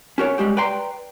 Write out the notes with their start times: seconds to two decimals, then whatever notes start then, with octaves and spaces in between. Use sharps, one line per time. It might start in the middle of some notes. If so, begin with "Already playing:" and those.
0.18 C#4 F#4 A#4 C#5
0.38 G3 G#3 F#4 G4
0.57 B4 D5 G5 A#5 C6